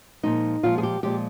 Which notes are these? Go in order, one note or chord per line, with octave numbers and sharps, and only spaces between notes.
A#2 F3 G#3 D#4
A#2 F3 G#3 F4
G#4
G4
A#2 F3 G#3 G4